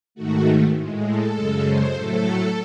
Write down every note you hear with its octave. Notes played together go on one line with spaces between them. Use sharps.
G#2 D#3 A3 F#4
A2 G#3
A4
F#2 C#3 G#3
C5
A2 F#3 A3 A4